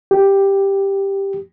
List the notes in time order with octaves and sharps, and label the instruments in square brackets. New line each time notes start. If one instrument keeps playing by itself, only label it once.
[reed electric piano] G4